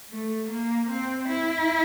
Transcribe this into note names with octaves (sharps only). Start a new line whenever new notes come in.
A3
A#3
C4
E4